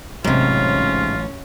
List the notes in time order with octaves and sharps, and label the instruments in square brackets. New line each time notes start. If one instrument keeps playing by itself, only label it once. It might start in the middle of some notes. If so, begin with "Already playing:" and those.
[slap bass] A1 F#3 [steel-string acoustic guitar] G#2 C3 [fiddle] C#4 [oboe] F4